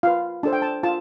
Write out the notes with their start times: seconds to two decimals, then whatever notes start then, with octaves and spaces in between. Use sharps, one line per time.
0.03 F4 B4 F5
0.43 D4 A4 C5 A5
0.53 G5
0.62 A5
0.83 F4 A5